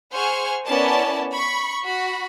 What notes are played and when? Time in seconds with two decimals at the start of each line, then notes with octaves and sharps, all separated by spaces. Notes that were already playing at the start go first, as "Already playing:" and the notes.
0.14 G#4 C5 F#5 G#5 C#6 F6
0.66 B3 C#4 E4 A#4 D5 A5
1.34 B5 C#6
1.85 F#4 B5